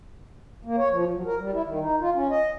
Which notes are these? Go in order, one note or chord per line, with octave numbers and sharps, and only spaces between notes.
A#3
C#5
F3
F#3
A#4
G3
E4
D#3
D#4
F4
C#4
D#5